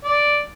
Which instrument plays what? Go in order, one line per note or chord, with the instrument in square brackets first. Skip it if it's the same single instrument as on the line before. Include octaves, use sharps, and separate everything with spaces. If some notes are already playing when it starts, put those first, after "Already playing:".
[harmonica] D5